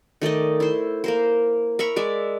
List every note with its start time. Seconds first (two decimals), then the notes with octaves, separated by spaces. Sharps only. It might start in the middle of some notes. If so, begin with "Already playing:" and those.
0.22 D#3 A3 D5 D#5
0.60 E4 C5
1.04 A#3 A#4 C5
1.79 A#4 E5 B5 C#6
1.96 G#3 D5 E5